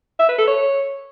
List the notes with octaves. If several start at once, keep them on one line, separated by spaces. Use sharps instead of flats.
E5
B4
A4
C#5